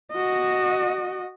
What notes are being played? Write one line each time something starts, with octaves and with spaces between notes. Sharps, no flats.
F#4 D#5